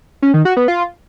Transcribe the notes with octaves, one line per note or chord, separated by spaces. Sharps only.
C#4
D#3
F#4
B3
F4